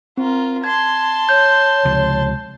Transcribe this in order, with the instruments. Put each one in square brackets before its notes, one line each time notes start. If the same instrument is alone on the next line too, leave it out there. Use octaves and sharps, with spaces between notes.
[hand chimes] C4 [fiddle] F4 A#4
[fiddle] A5 C6 [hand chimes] G#6
[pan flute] C#5 [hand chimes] G6
[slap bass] C#2 C3 F3